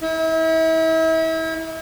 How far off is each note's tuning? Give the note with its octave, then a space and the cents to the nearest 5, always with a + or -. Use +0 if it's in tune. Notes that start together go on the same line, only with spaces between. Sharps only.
E4 -35